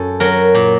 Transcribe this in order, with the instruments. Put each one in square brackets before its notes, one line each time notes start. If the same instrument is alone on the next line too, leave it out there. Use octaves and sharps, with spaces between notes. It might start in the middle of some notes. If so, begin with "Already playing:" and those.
Already playing: [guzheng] F#2 A4
F#3 A#4
A#2